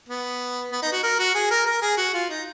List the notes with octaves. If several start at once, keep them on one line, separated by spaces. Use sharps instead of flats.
B3
B3
D#4
F#4
A#4
F#4
G#4
A#4
A#4
G#4
F#4
F4
D#4